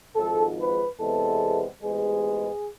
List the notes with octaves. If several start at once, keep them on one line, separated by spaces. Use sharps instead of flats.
G#1 G#2 F3 A4
B4
E2 C3 G#3 B3 A4
A1 G#2 G#3 B3 G#4